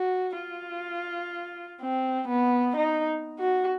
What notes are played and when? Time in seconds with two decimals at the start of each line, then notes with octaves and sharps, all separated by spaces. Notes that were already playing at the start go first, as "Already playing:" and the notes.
Already playing: F#4
0.40 F4
1.81 C4
2.28 B3
2.77 D#4
3.40 F#4